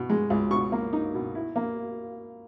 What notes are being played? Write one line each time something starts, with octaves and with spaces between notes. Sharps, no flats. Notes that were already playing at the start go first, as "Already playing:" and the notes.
Already playing: B2
G#3
C#2
B2 C#6
A#3
D#4
B2
E4
A#3